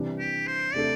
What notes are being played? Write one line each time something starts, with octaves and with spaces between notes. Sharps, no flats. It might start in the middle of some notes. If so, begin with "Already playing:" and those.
Already playing: C3 E3 G3 D4
G4
C5
C3 A3 D4 A4 D5